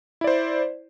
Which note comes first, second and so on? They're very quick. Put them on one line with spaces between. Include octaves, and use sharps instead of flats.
E4 D5 C5